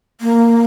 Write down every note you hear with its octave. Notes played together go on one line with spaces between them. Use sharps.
A#3